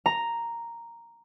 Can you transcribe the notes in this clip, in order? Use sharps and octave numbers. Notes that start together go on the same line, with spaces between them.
A#5